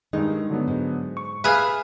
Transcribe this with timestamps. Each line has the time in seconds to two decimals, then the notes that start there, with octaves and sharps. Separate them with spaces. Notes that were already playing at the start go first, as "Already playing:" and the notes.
0.13 G2 D#3 G#3 D#4
0.50 D3 F#3 B3
0.68 G#2
1.17 C#6
1.44 G#4 B4 E5 F5 F6